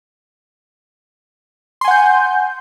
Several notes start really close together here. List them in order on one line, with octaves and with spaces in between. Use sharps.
C6 G#5 F#5 G6